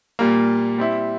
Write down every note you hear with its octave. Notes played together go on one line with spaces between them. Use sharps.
A#2 G3 A#3
G3 C4 E4